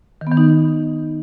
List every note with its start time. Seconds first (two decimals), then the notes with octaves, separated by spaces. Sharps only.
0.21 D#3
0.27 B3
0.32 D#3
0.37 D#4